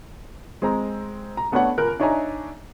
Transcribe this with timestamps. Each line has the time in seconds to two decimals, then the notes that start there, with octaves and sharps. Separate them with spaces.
0.62 G#3 C4 A#5
1.37 A#5
1.52 A3 B3 D4 B4 C#5 F#5
1.78 C#2 A#4 F#6
2.00 D4 D#4 C#5 E5 G#5 A#5